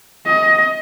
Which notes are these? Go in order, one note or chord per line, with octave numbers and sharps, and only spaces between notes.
D#5